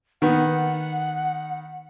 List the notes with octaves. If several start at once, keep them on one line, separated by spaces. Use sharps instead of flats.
D#3 B3 F#5